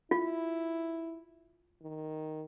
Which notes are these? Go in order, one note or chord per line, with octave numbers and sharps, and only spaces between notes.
E4 F4
D#3